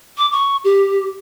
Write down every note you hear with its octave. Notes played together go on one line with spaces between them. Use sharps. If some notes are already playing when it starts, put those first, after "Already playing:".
D6
C#6
G4